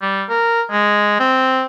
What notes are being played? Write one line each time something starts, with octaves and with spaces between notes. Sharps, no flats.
G3
A#4
G#3
C4